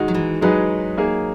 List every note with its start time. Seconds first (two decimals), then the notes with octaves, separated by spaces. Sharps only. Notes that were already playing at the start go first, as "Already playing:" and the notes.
Already playing: D#3 G#3 D#4 F#4
0.08 F#3
0.14 E3
0.41 F#3 G#3 D#4 G#4 B4 D#5
0.97 A#3 D#4 G#4